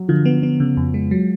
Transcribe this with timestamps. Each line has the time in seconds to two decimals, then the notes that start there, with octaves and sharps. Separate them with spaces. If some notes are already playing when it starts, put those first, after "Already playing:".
Already playing: F#3
0.09 D3 F3
0.25 B3
0.43 B3
0.60 C#3
0.77 F2
0.94 G#3
1.11 F#3